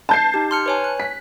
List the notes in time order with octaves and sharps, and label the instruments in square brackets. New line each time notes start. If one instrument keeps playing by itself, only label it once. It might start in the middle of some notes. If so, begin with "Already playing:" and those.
[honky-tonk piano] A5 G6 C7
[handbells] D#4 G4
C6 F6 C#7
B4 C#5 G#5
F#6
[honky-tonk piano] B6